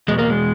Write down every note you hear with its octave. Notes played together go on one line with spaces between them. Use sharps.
E2 B2 G#3
A#3
G#3